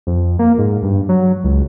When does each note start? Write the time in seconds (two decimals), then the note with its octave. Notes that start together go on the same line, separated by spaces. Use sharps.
0.07 F2
0.39 A#3
0.58 G#2
0.83 G2
1.09 F#3
1.44 C#2